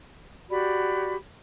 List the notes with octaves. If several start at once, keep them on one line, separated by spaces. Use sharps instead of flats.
F#4 G4 D5 B5